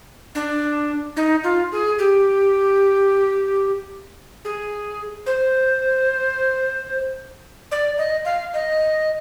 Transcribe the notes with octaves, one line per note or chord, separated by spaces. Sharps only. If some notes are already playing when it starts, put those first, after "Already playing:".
D4
D#4
F4
G#4
G4
G#4
C5
D5
D#5
F5
D#5